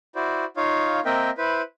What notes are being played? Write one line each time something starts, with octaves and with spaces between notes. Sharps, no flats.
E4 F#4 C5 D5
D#4 F4 C#5 F5
A#3 C4 A#4 D#5 E5 G5
E4 B4 C5 B5